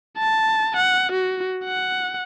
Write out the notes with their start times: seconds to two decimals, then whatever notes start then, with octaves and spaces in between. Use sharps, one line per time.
0.18 A5
0.76 F#5
1.12 F#4
1.65 F#5